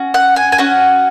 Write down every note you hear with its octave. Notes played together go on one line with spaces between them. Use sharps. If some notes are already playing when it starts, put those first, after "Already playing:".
Already playing: C#4 F#4
F#5
G#5
G#5
C#4 F#4 F#5